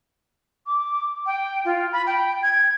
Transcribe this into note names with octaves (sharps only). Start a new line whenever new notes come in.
D6
G5
F4
B5
G5
G#6